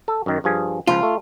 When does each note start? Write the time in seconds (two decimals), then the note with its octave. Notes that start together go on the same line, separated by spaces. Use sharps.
0.08 A4
0.26 F#2 D#3
0.44 G2 F3 G#4
0.87 C#2 F3 F4
1.03 A3